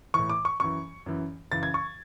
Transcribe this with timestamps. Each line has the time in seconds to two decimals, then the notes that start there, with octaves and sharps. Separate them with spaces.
0.14 A2 E3 C#6
0.30 D6
0.45 C#6
0.60 F#2 E3 C#6
1.06 F#2 E3
1.52 F#2 C#3 E3 A6
1.63 G#6
1.74 C#6